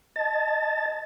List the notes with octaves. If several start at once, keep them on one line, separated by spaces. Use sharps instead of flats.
D#5 A5 A6